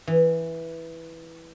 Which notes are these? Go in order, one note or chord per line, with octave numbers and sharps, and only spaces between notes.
E3